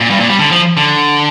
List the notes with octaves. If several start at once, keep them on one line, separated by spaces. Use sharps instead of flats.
A#2
G2
A#2
G3
D3
F3
D3